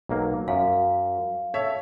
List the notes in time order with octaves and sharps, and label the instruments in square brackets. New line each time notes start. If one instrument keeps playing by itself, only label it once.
[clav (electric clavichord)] B1 F#3 A#3
[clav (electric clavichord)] F#2 [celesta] F5
[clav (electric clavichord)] A4 [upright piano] C#5 E5